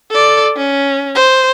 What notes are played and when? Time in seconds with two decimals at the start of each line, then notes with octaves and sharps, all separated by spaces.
0.11 A4 D5
0.57 C#4
1.15 C5